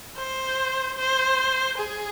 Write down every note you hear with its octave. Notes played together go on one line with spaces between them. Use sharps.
C5
C5
G#4